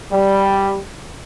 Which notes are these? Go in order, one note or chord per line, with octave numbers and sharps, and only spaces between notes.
G3